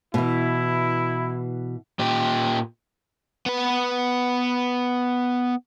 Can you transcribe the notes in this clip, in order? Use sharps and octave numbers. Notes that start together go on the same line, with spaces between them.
B2 E3 E4
A#2 G4
B3 B4